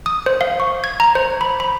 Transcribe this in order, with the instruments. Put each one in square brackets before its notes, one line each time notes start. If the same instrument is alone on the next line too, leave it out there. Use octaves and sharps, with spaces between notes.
[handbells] D#6
C5
F5
C#6
G#6
A#5
C5
B5
B5